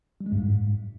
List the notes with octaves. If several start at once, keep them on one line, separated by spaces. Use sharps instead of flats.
G3
G#3
G2
G#2